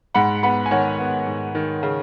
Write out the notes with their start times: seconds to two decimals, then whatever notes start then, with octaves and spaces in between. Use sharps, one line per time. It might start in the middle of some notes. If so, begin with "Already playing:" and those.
0.14 G#2 F#5 B5
0.43 B3 F#5 B5
0.66 G#5
0.71 D#3 C#5 F#5
1.00 B3
1.27 G#2
1.55 D#3
1.83 C#3